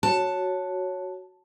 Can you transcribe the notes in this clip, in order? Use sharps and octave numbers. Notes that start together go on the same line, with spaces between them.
F#4 C#5 A5